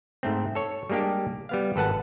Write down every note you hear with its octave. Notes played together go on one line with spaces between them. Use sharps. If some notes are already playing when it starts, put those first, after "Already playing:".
G#2 A3 C4
A4 C#5
G3 G#3 A#3 D4 G4
G3 B3 F5
G#1 A4 B4 F#5 A5